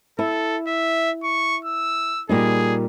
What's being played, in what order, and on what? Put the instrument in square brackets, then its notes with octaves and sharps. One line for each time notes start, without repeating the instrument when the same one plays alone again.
[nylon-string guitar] E4 [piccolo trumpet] A4
[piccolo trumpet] E5
C#6
E6
[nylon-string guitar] A#2 G3 D#4 [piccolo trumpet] G#4